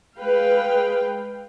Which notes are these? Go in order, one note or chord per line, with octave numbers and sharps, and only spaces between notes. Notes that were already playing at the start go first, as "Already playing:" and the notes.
G#3 B4 F5 G5